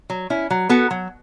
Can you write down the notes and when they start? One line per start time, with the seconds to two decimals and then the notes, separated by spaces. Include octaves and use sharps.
0.10 F#3
0.30 C#4 E4
0.50 F#3
0.69 B3 F#4 A4
0.91 F#3